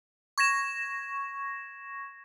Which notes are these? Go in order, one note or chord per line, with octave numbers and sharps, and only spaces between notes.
C#6 G#6 A#6 E7